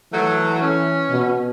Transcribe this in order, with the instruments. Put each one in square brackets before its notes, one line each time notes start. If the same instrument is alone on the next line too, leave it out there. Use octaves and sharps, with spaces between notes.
[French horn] E3 [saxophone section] F#3 A3
[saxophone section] C#4
[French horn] B2